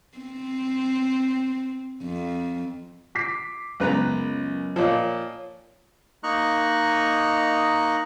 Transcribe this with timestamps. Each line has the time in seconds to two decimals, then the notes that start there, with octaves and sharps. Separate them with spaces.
0.18 C4
2.03 F2
3.15 D6 B6 C7
3.80 C#2 F#2 G#3 B3 B4 A#5
4.76 A#2 F3 A#4 C#5 D#5
6.23 A#3 D#4 D#5 A#5 C#6 F#6